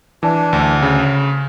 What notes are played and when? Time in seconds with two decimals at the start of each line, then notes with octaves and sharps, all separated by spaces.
0.23 E3 D4
0.53 D2
0.82 C#3